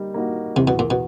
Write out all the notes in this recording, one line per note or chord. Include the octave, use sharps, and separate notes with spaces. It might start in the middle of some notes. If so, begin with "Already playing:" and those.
Already playing: G3 A#3 D#4
A#3 D#4 F#4
E2 C3
B2
A#2
B2